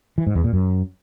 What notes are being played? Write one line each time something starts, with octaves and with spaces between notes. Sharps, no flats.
E3
G#2
E2
A#2
F#2